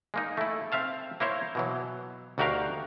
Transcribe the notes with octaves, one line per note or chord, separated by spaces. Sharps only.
G#3 A#3 D#4
A3 E4
C4 E5 F5 A5
A#3 E4 C5 C#5
B2 E3 F#3
D2 D#3 F#4 G4 A#4 F5